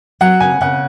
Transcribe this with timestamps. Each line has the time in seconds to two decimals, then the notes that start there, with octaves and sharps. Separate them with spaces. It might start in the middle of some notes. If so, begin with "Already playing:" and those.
0.21 F#3 F#5
0.40 C#3 G#5
0.61 C#3 F#5